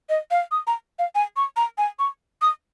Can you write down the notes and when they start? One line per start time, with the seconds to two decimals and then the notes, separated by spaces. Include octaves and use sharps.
0.09 D#5
0.31 F5
0.51 D#6
0.67 A#5
0.99 F5
1.15 G#5
1.37 C#6
1.57 A#5
1.78 G#5
1.99 C#6
2.42 D#6